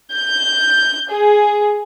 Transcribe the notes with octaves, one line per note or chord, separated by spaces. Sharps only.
G6
G#4